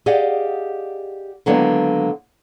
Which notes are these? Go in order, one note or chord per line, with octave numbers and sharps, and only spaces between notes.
G4 G#4 D5 D#5 F5 F#5
D3 D#3 F#3 G#3 A#3 B3